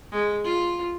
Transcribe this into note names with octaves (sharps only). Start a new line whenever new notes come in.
G#3
F4